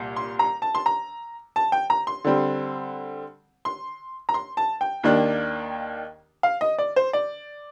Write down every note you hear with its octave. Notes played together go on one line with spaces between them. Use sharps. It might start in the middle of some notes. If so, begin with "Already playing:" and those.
Already playing: C2 A#2
C6
A#5
A5
C6
A#5
A5
G5
A#5
C6
D3 G3 C4
C6
A#5
C6
A5
G5
D#2 D#3 A#3 D4
F5
D#5
D5
C5
D5